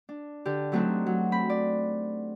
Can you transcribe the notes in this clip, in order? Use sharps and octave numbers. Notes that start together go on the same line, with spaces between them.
D4
D3 G4
F#3 A3 C4 D4 D#4 F#4
F#3
C4 B5
D5